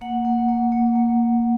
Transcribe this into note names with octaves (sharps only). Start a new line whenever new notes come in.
A#3 F#5
A#3
A#3
A#3
A#3